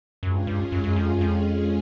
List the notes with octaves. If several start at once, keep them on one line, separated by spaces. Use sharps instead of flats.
F#2 G#3 C#4 F4 G#4
G2
G2
F#2
F#2
F2
F#2
F2